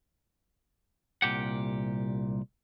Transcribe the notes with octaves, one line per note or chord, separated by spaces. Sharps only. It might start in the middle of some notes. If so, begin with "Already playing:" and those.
C2 A#2 G4 F#5